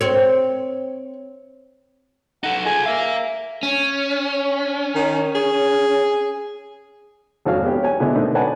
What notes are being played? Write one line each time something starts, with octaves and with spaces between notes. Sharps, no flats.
C4 C#5
D#4 A4 F#5
F4 G#4 G#5
A#4 E5 F5
C#4
D#3
G#4
G#1 F2 D4 F#4 C#5 F5
B3 G4 C#5
C#5 G#5
B2 D3 G#3 B3 D4 E4
B2 D#3 A3 C4 D4 D#4
B4 C#5 D5 F#5 G#5 A5